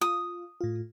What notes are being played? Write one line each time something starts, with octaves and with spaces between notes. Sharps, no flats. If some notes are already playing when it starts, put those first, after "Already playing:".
F4 D#6
A2 F4